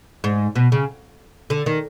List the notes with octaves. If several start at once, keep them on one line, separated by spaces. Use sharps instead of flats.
G#2
B2
C#3
D3
D#3